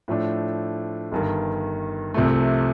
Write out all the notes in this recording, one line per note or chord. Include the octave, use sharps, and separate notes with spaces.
A2 F3 A3 D4
G1 G2 D#3
C2 C3 F3 A3